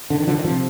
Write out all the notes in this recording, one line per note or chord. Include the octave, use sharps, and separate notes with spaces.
D3
D#3
D3 F3
D#3
C3 D3 F3